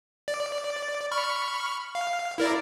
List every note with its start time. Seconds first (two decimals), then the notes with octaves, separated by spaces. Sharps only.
0.28 D5
1.11 B5 C#6 F6
1.95 F5
2.38 E4 A#4 D5